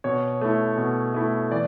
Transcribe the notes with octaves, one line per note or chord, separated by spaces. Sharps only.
B2 C#5
A3 E4
B2
A3 E4
E3 D5